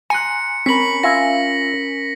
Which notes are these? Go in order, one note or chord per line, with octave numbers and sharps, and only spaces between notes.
G#5 A#5 C6 F#6 C#7
C4 C#4 A#4 B5 B6 F#7
F4 E5 G#5 A#6